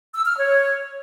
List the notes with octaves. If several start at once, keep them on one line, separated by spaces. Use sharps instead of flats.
E6
F6
C#5